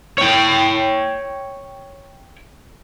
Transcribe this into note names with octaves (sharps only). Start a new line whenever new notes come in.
C#5 G5